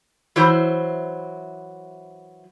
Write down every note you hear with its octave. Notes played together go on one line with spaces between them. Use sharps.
E3 F#3 E4 C5